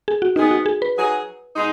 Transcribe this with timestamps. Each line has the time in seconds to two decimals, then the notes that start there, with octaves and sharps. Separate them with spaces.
0.08 G#4
0.22 F#4
0.35 D#3 B3 D#4 G#4
0.51 F#4
0.66 G#4
0.82 B4
0.97 F#3 D#4 G#4
1.56 B2 G#3 D#4